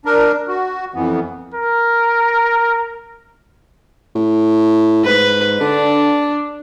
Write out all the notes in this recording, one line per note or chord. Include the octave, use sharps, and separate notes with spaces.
D4 A#4
F#4
F2 E3 B3
A#4
A2
G#2 B4
D3 D4